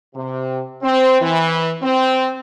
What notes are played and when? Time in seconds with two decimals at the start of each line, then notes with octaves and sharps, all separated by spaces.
0.14 C3
0.82 C4
1.20 E3
1.82 C4